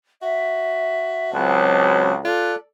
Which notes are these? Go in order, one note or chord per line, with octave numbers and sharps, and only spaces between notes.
F#4 E5
C#2 F#3 C4 A5 F#6
F4 A4 D5 F#6